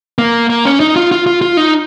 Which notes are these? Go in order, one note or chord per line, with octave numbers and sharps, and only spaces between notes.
A#3
A#3
C#4
D#4
F4
F4
F4
F4
D#4